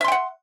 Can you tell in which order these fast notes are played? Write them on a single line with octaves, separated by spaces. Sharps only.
E5 C6 G5 F#5